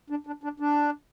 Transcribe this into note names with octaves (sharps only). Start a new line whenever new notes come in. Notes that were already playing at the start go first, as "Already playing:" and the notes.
D4
D4
D4
D4